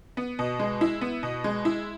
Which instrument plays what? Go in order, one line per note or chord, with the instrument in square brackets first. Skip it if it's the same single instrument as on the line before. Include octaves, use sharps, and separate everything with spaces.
[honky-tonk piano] B3
B2
G#3
E4
B3
B2
G#3
E4